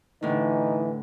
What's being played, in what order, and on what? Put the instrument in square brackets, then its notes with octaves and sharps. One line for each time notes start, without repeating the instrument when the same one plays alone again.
[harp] A2 D3 [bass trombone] E3 [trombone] D#4